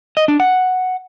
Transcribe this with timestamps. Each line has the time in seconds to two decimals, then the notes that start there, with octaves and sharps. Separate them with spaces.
0.17 D#5
0.28 D4
0.40 F#5